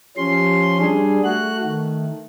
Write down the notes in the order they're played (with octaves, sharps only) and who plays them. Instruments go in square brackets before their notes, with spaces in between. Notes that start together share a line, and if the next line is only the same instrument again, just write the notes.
[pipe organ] F3 C#4 C6 [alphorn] G4
[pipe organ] G3 G#4 [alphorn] D4
[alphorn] A3 [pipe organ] F#4 F#6
[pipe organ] D#3